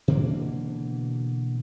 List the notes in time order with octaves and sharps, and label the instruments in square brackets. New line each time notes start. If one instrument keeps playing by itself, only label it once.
[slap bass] B2 D3 E3 A#3